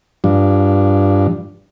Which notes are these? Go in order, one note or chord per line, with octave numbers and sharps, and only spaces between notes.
G2 F3 D4